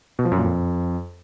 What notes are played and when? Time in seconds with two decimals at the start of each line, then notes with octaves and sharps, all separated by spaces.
0.19 B2
0.25 F3
0.32 F#2
0.38 A#2
0.44 F2